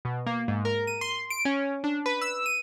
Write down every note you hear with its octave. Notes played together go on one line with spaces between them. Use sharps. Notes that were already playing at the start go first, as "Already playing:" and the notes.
B2
A#3
G#2
A#4
D#7
C6
D7
C#4
D4
B4
E6
D#7